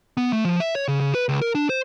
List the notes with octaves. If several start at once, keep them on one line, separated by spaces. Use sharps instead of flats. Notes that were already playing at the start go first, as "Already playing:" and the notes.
B3
A3
F3
E5
C#5
C#3
C#3
B4
C#2
A#4
D4
C5